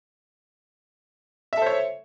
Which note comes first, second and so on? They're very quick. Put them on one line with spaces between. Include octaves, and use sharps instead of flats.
E5 A4 C5 C#5